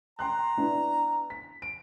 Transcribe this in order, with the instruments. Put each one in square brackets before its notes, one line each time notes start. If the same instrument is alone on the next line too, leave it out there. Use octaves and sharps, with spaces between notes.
[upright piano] G5 C6 F#6 [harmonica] A#5
[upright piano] B3 D4 E4
B6
D7